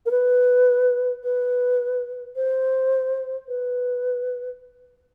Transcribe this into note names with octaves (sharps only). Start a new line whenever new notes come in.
A#4
B4
B4
C5
B4